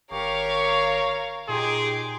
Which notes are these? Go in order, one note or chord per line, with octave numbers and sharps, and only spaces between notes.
G#1 G4 A#4 C#5 F5 C#6
A#2 D#4 G4 G#4 C6 D6